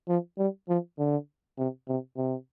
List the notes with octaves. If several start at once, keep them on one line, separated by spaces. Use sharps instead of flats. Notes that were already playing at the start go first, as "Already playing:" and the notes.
F3
G3
F3
D3
C3
C3
C3